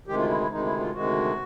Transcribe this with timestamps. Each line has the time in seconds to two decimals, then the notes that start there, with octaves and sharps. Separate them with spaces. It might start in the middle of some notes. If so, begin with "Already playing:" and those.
0.07 D2 C3 D#3 G#3 G4
0.18 F4
0.30 E4
0.40 E4
0.50 D2 C3 D#3 G#3 D#4
0.65 E4
0.80 F4
0.94 D2 C3 D#3 G#3 F#4